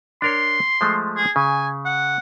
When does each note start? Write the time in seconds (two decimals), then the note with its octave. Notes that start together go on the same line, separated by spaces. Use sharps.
0.22 D4 A#4 C#5 C6
0.81 F3 G#3 A3
1.17 G#4
1.36 C#3 G#5
1.85 F#5